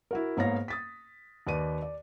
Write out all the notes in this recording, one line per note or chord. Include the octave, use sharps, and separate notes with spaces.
E4 F#4 A#4
G#2 A#3 B3 C#5 F5 A#6
D#6 A6 B6
D#2 B4 D5 D#7
D5